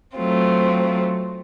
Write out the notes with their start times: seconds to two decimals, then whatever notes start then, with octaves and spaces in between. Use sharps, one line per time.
0.17 F#3 A3 C4 F4